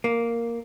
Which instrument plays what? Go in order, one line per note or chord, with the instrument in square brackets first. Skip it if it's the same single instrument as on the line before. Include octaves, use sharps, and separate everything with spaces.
[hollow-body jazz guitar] A#3